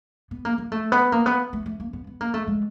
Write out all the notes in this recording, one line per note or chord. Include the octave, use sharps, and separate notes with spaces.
B3
A#3
A#3
A3
B3
A#3
B3
A3
A3
A#3
B3
B3
A#3
A3
G#3